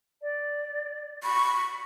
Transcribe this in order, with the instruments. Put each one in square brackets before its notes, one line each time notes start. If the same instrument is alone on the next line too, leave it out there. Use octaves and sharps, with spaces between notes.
[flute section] D5
[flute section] B5 [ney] C#6